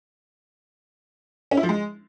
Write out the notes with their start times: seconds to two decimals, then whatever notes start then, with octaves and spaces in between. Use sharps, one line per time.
1.51 C#4
1.57 E4
1.63 F3
1.69 G#3